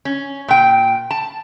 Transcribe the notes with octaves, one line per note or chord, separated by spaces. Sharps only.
C#4
A#2 G5
A5